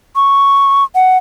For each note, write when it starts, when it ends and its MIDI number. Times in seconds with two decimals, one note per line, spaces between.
0.16 0.84 85
0.95 1.18 78